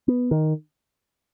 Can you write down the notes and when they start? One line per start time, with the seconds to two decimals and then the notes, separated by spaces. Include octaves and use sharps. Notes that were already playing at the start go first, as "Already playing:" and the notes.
0.08 B3
0.31 D#3